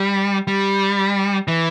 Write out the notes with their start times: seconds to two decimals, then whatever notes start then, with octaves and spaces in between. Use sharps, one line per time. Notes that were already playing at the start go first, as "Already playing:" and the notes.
Already playing: G3
0.47 G3
1.48 E3